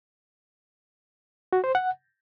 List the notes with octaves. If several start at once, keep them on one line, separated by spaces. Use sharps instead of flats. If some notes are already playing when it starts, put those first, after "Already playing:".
F#4
C5
F#5